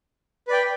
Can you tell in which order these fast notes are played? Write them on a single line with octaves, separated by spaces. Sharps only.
B4 D5 G5